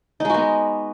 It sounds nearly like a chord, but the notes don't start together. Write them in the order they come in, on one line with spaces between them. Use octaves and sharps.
D#4 G#3 F#4 B3